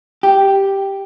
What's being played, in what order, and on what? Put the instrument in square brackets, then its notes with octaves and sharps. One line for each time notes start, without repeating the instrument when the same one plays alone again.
[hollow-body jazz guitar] G4